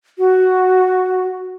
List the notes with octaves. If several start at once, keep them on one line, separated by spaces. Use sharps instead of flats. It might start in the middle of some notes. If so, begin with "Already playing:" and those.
F#4